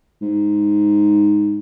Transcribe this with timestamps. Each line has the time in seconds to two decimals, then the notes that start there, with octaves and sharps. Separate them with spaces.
0.21 G#2